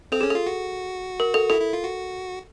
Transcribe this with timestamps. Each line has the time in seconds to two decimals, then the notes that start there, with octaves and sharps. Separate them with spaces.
0.12 C4 A4
0.21 C#4 G#4
0.30 F4 A4
0.46 F#4
1.20 A#4
1.34 A4
1.50 E4 A4
1.61 E4
1.73 F4
1.84 F#4